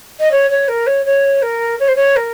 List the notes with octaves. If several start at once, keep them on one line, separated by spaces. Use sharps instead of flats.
D#5
C#5
C#5
A#4
C#5
C#5
A#4
C#5
C5
C#5
A#4